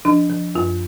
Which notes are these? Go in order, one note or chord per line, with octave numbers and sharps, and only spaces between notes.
F3 D4
F3
F#2 F4